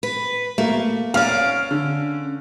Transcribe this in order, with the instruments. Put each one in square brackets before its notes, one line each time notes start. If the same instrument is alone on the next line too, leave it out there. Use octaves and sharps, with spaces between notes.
[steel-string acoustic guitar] B4
[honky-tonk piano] A3 [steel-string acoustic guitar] A#3
[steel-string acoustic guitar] C#4 D5 [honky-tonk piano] F5 F6
[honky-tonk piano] D3